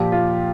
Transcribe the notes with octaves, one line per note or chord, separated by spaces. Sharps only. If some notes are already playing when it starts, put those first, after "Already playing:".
Already playing: A#2 F3 G4
F4